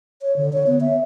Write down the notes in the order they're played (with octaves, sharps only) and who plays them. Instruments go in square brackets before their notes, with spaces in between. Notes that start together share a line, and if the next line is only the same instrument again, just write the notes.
[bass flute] C#5
D3
C#5
B3
E5